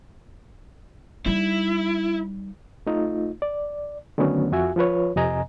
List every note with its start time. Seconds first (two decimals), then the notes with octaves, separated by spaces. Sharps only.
1.26 G3 D#4 E4
2.87 A3 D#4 F4
3.42 D5
4.18 D3 D#3 F#3 A3 B3 C#4
4.52 F2 F4 F#4 E5 G#5
4.76 F3 F4 B4 C#5
5.16 F2 C3 D#5 G#5 A#5